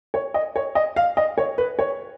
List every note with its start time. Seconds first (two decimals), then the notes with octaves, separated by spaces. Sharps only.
0.14 C#5
0.34 D#5
0.56 C#5
0.75 D#5
0.96 F5
1.17 D#5
1.38 C#5
1.58 B4
1.79 C#5